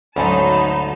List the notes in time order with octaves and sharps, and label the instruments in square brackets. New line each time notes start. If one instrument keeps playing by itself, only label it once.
[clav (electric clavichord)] D2 G#2 A4 [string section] F#3 D#4 A5 [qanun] C#4 [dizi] B5